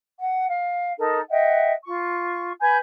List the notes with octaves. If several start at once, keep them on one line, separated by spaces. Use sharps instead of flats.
F#5
F5
D#4 A4 A#4
D#5 E5 F#5 G5
F4 C#6
B4 G#5 B5 G6